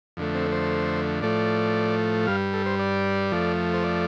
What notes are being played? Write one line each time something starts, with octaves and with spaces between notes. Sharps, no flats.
F2 D3 A3
C4
C5
A2 F3 A3 D5
G2 G3 F5
A4
C5
D5
F2 F3 A3
C5
D5